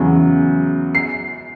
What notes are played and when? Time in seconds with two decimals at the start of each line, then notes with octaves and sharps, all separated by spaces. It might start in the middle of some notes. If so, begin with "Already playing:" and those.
Already playing: E2 C#3 F#3
0.95 C7